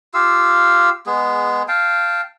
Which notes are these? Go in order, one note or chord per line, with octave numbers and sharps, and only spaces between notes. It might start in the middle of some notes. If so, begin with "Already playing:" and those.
F4 G4 F5 E6
G#3 B3 G#4
F5 G5 A5